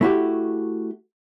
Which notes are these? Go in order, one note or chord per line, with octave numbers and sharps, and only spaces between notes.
A3 E4 F#4 G4